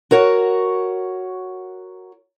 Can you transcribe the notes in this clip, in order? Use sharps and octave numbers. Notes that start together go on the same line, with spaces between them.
F#4 A#4 C#5 F#5